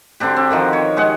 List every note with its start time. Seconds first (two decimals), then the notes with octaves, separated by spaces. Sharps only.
0.20 D3 C4 D4 G4
0.37 C4
0.51 D3 D#3 F3
0.73 C#5
0.97 G#3 G4 G#4 F#5